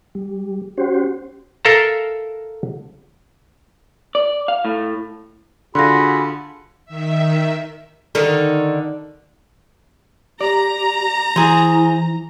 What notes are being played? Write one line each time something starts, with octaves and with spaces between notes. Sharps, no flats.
G3
C#4 F#4 G4 C5
A4 A#4 E5 F5 A5 A#5
D5
F5
A2
D3 F4 F#4 G#4 B5 C6 F#6 A#6
D#3 E5
D3 D#3
G4 D5 A#5
E3 E4 G#4 C5